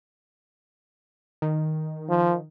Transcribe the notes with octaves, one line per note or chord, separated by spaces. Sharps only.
D#3
F3